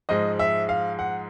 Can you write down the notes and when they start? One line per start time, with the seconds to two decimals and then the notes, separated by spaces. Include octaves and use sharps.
0.09 G#2 F3 G#3 D#5
0.39 E5
0.69 F5
0.99 F#5